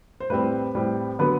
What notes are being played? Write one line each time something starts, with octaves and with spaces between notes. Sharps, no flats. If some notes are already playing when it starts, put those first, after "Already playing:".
C5
A2 G3 C4 B4
A2 G3 C4
D3 F#3 B3 B4